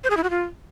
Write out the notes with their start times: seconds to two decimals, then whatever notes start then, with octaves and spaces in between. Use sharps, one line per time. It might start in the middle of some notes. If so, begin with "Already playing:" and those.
0.04 C5
0.10 G#4
0.17 E4
0.23 F#4
0.30 F4